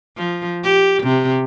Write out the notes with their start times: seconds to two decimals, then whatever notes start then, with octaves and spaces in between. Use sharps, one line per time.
0.17 F3
0.64 G4
1.03 C3